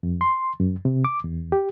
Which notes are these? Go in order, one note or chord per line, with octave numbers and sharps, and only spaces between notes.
F2
C6
F#2
C3
D6
E2
G4